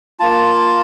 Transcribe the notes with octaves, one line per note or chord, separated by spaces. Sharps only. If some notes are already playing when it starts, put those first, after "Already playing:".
A#3 F4 A5